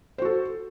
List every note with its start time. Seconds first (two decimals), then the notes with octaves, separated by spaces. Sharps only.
0.18 C5
0.22 F#4
0.25 A4